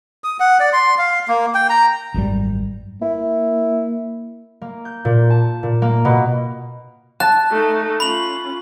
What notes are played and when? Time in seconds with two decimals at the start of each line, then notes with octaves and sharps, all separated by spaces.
0.24 D#6
0.40 F#5
0.60 D5
0.73 C6
0.98 F5
1.28 A#3
1.55 G5
1.70 A#5
2.14 G#1 F#2 D3 G3
3.02 A#3 E4
4.61 A#3
4.85 G6
5.05 A#2
5.30 A5
5.63 A#2
5.82 A#3
6.05 B2
7.20 A5 F#6
7.51 A3 D#4
8.00 C#4 F4 B5 F#7